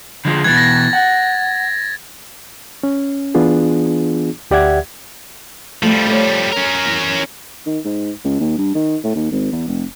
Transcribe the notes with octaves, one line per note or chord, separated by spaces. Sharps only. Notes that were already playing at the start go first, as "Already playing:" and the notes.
D3 F3 G#3
B2 E3 G#6 A6
A#6
F#5
C#4
E3 B3 D4 F4 G#4
D2 G4 D5 E5 F#5 G#6
F3 G3 A3
A4 C#5
C#4 A#4
E2
D#3
G#2
C#2
D#2
G2
D#3
A2
D#2
G#1
E2
F1